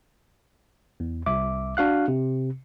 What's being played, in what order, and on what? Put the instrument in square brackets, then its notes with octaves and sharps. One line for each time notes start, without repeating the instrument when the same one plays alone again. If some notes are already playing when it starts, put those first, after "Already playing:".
[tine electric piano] E2
C2 E5 D6
D4 F#4 F5 F#6
C3